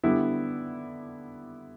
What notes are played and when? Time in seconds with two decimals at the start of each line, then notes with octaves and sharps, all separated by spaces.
0.03 D3 G3 B3 E4